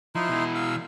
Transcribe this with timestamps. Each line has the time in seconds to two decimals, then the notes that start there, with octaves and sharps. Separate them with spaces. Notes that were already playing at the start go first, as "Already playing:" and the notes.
0.15 F3 D#4 E4 C6
0.28 B2 E3
0.55 F5 E6